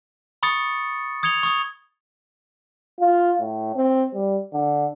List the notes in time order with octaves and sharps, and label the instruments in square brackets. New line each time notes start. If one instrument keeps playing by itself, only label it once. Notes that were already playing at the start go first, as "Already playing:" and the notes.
[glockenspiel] B5 C#6 D#6 A6 C#7
D#6 G#6 C#7 F7 G7
C#6 D#6
[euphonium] F4
A2
C4
G3
D3